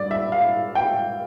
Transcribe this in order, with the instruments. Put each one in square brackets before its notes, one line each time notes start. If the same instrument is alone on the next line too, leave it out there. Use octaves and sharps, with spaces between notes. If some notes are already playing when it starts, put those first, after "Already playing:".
Already playing: [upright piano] G2 D5
E5
F5
G5